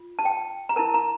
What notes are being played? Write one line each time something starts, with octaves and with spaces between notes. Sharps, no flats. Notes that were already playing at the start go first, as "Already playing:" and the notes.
Already playing: F4
A5
G5
A#5
E4 A#4 A5
A#5